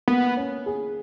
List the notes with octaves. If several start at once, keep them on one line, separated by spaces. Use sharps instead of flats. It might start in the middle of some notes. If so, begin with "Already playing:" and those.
A#3 B3
C#4
G#4